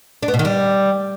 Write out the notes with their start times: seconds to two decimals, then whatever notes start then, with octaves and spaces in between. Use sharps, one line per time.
0.23 D4
0.28 B3
0.34 B2
0.39 D#3
0.45 G3